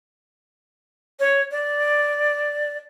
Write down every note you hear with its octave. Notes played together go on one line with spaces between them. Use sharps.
C#5
D5